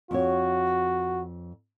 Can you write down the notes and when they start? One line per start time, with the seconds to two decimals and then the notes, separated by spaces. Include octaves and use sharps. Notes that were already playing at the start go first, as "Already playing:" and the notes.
0.11 F2 F#4 C#5